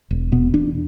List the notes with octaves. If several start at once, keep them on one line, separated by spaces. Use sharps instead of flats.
E1
B2 B3
E2 D4